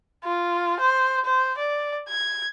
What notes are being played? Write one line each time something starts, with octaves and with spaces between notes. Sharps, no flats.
F4
C5
C5
D5
G#6